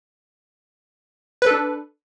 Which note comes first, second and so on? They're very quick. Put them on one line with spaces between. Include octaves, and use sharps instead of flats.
B4 A4 D4